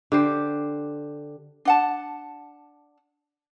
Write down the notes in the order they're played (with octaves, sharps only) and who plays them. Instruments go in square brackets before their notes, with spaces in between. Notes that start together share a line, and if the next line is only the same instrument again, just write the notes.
[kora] D3 G4 C5
[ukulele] D4 F#5 A5